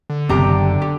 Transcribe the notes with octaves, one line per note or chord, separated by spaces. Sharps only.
D3
F#1 F#2 C3 B3 G4 A#5
G4